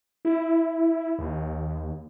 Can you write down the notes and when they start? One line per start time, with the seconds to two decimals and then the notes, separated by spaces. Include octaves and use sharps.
0.25 E4
1.19 D#2